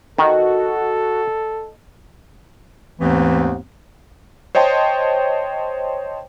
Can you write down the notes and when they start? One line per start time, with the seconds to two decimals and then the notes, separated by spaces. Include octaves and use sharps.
0.18 D#3 F#4 A4 D#5
3.00 D#2 G#2 E3 A3 B3 C4
4.55 C5 C#5 D#5 G5 A5 C6